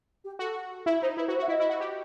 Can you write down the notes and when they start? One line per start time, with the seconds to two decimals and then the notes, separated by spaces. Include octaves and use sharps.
0.24 G4
0.39 F#4 A4
0.86 E4 E5
1.02 D#4 C5
1.17 E4 B4
1.28 F#4
1.33 C5
1.39 F#4 E5
1.48 E4 D#5
1.60 E4
1.69 F#4
1.80 G4